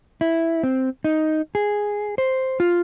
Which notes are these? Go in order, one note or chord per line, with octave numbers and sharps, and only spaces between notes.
E4
C4
D#4
G#4
C5
F4